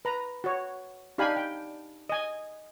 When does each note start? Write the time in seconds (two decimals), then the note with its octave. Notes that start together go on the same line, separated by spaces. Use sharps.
0.05 B4 A#5
0.44 F#4 C#5
1.18 D4 D#4 G4 F5 G#5 B5
1.37 G5
2.09 D#5 G#5